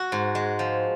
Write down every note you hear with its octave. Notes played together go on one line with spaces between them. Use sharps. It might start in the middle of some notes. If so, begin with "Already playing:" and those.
Already playing: F#4
G#2
G#3
F3